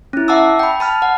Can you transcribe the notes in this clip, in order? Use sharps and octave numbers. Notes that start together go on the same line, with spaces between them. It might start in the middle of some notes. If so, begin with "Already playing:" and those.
C#4 E4
E5 F#5 A5 D6 E6
G5 B5
A5 B5 F6
F#5